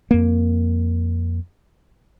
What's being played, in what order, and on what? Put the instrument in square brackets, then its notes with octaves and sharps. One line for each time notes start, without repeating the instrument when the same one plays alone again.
[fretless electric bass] F2 A#3